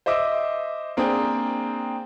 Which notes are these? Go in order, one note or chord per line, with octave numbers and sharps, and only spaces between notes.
C5 D#5 E5 D6 E6
A#3 C4 D4 G#4 G5